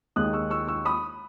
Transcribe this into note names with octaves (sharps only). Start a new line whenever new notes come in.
D#2 D#3 G#3 D#6 F#6
C#6 E6
C#6 E6
C#6 E6
B5 D#6